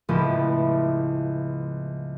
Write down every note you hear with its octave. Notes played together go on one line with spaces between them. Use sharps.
C#2 A2 F3 A3 B3 E4